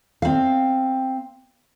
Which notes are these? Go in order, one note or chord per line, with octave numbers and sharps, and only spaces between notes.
C4 F5